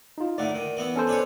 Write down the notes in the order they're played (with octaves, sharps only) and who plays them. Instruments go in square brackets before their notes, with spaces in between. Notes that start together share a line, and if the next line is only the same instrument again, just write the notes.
[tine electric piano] D#4 F4
[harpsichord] A2 D3 A3 [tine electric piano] D5 F#5
[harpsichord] D#3
E3 B3 E4
[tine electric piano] C#4 A4 C5
[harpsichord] D4 B4 C#5